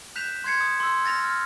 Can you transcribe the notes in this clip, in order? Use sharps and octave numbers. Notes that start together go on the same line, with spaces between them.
F#6 G6 B6 E7 F7
C6 F#6 G#6 C7 C#7
D#6
C6 E6
F6 A6 A#6 F7
F6